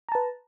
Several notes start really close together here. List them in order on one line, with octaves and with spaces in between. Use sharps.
A#5 A5 B4